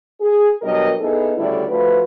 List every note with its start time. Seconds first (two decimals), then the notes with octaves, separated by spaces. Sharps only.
0.20 G#4
0.62 B2 F#3 G3 D4 A#4 D#5
1.00 B3 D#4 E4 G#4 A4
1.36 D2 C#3 G3 E4 A4 D5
1.68 F3 A3 F#4 B4